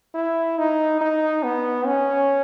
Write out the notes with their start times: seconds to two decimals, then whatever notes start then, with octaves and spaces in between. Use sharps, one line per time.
0.15 E4
0.58 D#4
1.01 D#4
1.43 B3
1.86 C#4